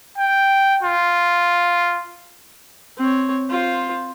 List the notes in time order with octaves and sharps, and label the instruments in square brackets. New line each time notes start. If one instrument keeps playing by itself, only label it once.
[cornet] G5
F4
[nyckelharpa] C4 C#5
F4 C5